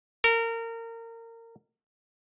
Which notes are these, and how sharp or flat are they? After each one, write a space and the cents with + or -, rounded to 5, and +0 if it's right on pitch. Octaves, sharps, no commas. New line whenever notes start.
A#4 -25